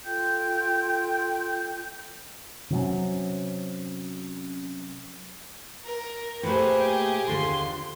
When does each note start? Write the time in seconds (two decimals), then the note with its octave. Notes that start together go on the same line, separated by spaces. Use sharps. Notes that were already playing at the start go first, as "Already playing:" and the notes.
0.04 F4 A4 G5 G6
2.70 C3 F#3 C#4
5.84 A#4
6.43 A#2 A3 G4 G#4 B4 C5
6.78 G5
7.28 D#2 D3 F4 C6